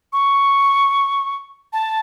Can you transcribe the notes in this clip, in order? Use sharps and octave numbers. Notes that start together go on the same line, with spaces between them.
C#6
A5